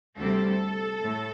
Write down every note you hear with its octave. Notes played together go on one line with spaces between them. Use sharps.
D2 C3 G3 C4 A4
A2